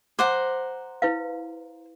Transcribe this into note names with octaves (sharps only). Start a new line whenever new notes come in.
C5 F#5 A#5 D6
E4 B4 F5